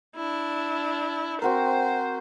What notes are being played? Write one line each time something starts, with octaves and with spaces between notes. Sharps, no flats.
D4 E4
C4 F#4 A#4 C5